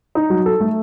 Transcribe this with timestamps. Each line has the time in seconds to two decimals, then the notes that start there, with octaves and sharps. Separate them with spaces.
0.15 D#4
0.30 F#3
0.46 A4
0.60 A3